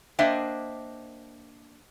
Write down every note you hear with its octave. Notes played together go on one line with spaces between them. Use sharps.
A#3 D4 C5 D#5 E5 G5